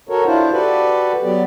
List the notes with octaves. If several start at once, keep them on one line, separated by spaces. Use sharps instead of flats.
F#4 A4 A#4 C#5
D4 E4 F4 C5
F#4 G4 A4 B4 D5
F#3 B3 G4 D5